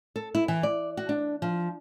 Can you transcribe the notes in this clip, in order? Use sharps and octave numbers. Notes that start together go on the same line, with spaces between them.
A4
E4
E3
D5
F#4
D4
F3